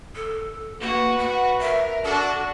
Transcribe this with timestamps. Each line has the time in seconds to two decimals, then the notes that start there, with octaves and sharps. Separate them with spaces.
0.15 A4
0.81 A#3 F#4 B4
1.19 F#4 F#5
1.59 A#4 E5
2.04 D4 F#4 A4